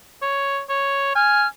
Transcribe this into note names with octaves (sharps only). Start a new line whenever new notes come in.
C#5
C#5
G#5 F6